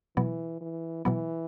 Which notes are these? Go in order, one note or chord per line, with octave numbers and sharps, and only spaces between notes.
B2 E3 F#3 B3
E3
B2 E3 F#3 B3